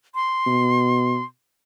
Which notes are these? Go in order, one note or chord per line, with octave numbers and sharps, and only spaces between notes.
C6
B2